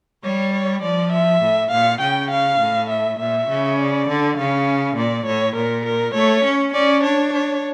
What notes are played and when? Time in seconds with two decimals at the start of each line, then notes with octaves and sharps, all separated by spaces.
0.24 G3 C#5
0.54 C#5
0.82 F3 D5
1.12 E5
1.42 A2
1.71 A#2 F5
2.01 C#3 G5
2.31 F5
2.60 A2
2.90 E5
3.19 A#2 E5
3.49 C#3
3.79 D5
4.09 D3
4.37 C#3 F5
4.96 A#2 D5
5.26 A2 C#5
5.56 A#2 A#4
5.85 A#4
6.14 A3 C#5
6.44 C#4
6.74 C#4 D5
7.03 D4 C#5
7.33 C#5